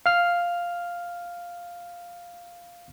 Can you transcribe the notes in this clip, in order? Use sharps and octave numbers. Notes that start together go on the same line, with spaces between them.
F5 F6